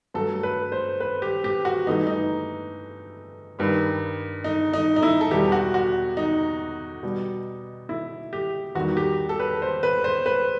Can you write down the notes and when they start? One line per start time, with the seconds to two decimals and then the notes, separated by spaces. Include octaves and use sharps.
0.14 G2 F#3 A3 A4
0.43 B4
0.72 C5
1.00 B4
1.22 G4
1.44 G4
1.65 F#4
1.86 G2 E3 A3 D#4
2.07 D#4
3.59 G2 D#3 G3
4.44 D#4
4.73 D#4
4.96 D#4
5.03 E4
5.21 A4
5.31 E2 B2 G3 G4
5.52 F#4
5.74 F#4
6.17 D#4
7.03 B2 G3
7.89 E4
8.33 G4
8.75 E2 D#3 G3 F#4
8.97 G4
9.29 A4
9.40 B4
9.62 C5
9.83 B4
10.04 C5
10.26 B4